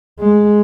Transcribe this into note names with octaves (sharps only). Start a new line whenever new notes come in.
G#3